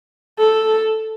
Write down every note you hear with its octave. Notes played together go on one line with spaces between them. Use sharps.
A4